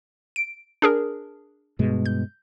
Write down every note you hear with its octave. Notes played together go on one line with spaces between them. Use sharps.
D7
D4 G#4 A#4
G2 B2 G#3
G6